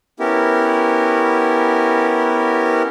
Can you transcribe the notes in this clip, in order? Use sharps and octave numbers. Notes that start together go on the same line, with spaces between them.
B3 C#4 E4 G4 A#4